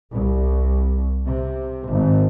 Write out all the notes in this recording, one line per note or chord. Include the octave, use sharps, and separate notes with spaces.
C2
C3
G#1